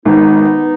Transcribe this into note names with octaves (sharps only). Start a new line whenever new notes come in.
G#1 G#2 D#3 B3 D#4